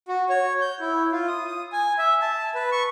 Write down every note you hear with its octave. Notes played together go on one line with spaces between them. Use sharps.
F#4
C#5
G6
E4
F4
D#6
D#6
G#5
E5
A5
B4
C#6